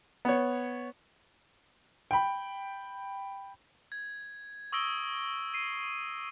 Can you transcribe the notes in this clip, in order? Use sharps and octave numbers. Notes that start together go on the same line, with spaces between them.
B3 C#5
G5 B5
G#6
C#6 D#6 E6 A#6 D7 G7
C7 D#7